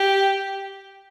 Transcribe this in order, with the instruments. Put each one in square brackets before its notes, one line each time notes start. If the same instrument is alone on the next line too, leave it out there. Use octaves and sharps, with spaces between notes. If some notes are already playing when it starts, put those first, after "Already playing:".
Already playing: [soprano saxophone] G4